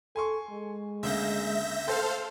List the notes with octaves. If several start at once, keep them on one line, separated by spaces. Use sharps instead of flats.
A4 G#5 C6 C#6
G#3
D2 C#3 A#3 E5 G6 A#6
A4 C5 F5 G5 C6 G6